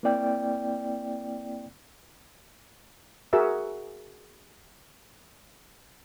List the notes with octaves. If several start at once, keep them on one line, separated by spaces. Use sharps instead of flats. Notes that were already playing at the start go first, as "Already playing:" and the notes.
A#3 C4 E4 D5 G5
F#4 G#4 A#4 E5 E6